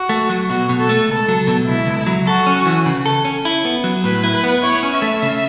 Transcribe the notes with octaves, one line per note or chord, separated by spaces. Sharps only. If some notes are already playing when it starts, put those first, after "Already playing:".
Already playing: F#4
A3
F#3
B2 F#4
B2
A4
A3
C#2 A4
F#3
B2
C#2 E4
C#2
F#3
F#4 A4
C#4
E3
C#3
A4
C#4
E4
B3
F#3
A2 B4
E4
B4
B3
E4 C#5
C#4
E5
A3
C#3